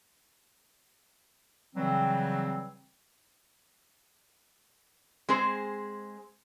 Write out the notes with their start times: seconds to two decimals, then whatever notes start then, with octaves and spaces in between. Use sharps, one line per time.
1.76 C#3 E3 F#3 G3 C4
5.29 G#3 C4 G#4 C5